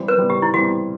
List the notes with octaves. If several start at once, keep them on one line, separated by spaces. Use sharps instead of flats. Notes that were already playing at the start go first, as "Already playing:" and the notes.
Already playing: E3 G3 C4
B4
E3 G3 C4
G4
E4
E3 G3 C4 F#4